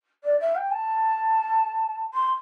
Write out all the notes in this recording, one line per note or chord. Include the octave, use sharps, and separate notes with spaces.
D5
E5
G5
A5
C6